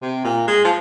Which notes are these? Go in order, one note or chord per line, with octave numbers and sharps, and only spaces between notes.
C3
A#2
G#3
F3